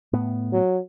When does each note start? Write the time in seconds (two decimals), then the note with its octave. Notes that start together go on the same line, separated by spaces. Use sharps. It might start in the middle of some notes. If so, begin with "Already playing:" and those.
0.13 A2 B3
0.52 F#3